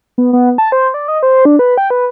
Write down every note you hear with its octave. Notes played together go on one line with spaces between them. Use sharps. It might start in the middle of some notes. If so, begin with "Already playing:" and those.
B3
B3
A5
C5
D5
D#5
C5
D4
B4
G5
B4